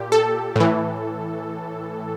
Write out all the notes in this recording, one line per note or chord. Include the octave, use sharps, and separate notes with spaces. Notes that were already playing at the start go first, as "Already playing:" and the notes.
Already playing: A#2 G4
A4
A2 E3